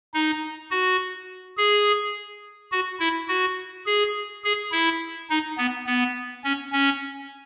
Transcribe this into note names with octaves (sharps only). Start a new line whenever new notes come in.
D#4
F#4
G#4
F#4
E4
F#4
G#4
G#4
E4
D#4
B3
B3
C#4
C#4